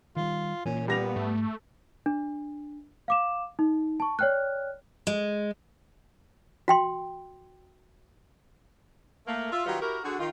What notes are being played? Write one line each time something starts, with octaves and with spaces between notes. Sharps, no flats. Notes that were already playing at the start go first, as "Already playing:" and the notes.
D#3 G3 F4
A#2 E3 A#3 C#4
G3 B3 A#6 F7
G#2 A3
D4
F5 D6 E7
D#4
A5 C#6
C#5 D5 G5 F6 F#6
G#3
F#4 G5 C6
A3 A#3
F4 E5
D#3 F#3 G3 F4 F#4 B4
E4 F#4 G4 A#4
D3 F#4 G#4
D#3 F4